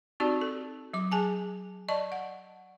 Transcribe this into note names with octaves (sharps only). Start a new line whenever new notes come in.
C4 D#4 F#4 G4 D5
A4
F#3 D6
G#4 G#5 A5
D5 D#5 A5 C#6
F#5